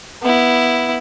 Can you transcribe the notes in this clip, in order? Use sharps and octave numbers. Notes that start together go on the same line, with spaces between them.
B3 E4